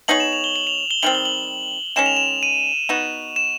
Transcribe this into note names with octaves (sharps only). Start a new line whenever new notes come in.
B3 D#4 G#4 C#5 F#7
E7
F7
G7
F#7
F7
G7
D#3 G3 C4 F#7
G7
F#7
D#3 G#3 C#4 E7
F7
E7
D#7
B3 D#4 F#4 E7
E7